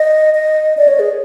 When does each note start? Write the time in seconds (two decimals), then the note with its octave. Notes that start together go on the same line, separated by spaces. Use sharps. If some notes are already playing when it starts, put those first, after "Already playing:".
Already playing: D#5
0.35 D#5
0.78 D5
0.88 C#5
0.99 G#4